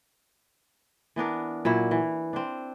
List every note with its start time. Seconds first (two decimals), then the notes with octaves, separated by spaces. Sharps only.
1.16 E3 B3 D4 A#4
1.65 A#2 F#3 E4
1.91 E3
2.33 C4 D4